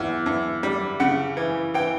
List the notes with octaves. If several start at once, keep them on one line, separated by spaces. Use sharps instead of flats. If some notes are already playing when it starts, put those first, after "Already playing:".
Already playing: E2
E2
G3
C#3 F#5
E3
E3 G5